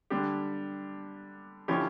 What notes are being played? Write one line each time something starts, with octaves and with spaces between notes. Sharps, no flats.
D3 G3 D4 G4
D3 F3 C#4 E4 G4